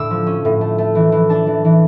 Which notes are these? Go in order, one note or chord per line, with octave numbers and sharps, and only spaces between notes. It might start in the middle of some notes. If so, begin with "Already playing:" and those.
Already playing: A2 D3 D4 D6 E6
F3
C#4
A2
A3
A3
E3
E3
D4 A5
E3
E3